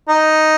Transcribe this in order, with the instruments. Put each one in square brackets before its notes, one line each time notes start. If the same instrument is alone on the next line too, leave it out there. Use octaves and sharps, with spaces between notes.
[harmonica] D#4